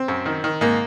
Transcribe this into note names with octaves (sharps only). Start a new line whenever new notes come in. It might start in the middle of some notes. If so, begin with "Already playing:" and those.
Already playing: C4
F#2
D#3
D#3
G#2 A#3